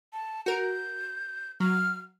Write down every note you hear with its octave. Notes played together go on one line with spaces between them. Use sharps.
A5
F#4 A#4 G6
F#3 F6